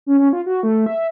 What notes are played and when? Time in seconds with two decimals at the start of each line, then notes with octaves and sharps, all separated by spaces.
0.06 C#4
0.19 C#4
0.33 F4
0.46 F#4
0.63 A3
0.86 E5